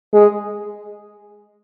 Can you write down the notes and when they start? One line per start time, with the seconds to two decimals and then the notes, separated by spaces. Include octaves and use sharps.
0.13 G#3